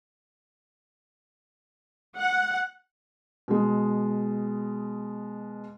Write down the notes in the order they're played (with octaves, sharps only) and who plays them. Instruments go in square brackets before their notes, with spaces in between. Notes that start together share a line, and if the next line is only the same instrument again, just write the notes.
[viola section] F#5
[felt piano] B2 G#3